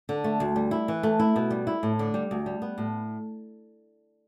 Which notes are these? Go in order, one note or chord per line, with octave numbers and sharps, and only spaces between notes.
D3
A3
D2
G3
E4
E3
A3
E4
B2
G3
E4
A2
D3
G3
D2
G3
B3
A2